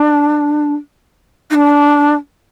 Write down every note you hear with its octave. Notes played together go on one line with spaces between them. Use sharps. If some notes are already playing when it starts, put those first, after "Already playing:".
Already playing: D4
D#4
D4